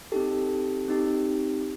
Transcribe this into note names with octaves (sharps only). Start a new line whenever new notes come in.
C4 D#4 G4 A4
C4 D#4 G4